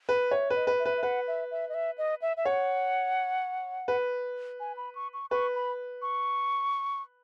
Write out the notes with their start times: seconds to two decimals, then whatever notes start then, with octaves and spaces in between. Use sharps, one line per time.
0.09 B4
0.31 C#5 E5
0.50 B4
0.56 D#5
0.67 B4
0.79 E5
0.85 B4
0.97 E5
1.03 B4 F#5
1.27 E5
1.51 E5
1.69 D#5
1.74 E5
1.98 D#5
2.22 E5
2.37 E5
2.45 C#5 F#5
3.88 B4
4.60 G#5
4.77 B5
4.95 C#6
5.14 C#6
5.30 B4 C#6
5.55 B5
6.02 C#6